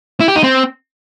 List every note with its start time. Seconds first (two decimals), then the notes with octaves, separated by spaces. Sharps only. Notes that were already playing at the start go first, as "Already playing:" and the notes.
0.20 E4
0.28 G4
0.36 D#4
0.44 C4